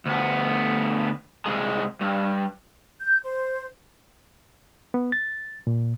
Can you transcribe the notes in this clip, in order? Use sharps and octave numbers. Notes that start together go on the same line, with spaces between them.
D2 B3
C2 G#3
G2
G6
C5
B3
A6
A#2